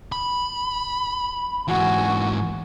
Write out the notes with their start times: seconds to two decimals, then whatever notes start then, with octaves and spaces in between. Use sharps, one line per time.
0.12 B5
1.68 G#2 E3 F#4 G#5